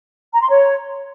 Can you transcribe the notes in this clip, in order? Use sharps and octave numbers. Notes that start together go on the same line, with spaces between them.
A#5
C6
C#5